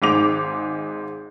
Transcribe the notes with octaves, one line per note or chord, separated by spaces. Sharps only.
G#1 G#2 D6 F7